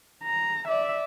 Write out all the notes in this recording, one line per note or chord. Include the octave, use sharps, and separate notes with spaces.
A#5
D5 E5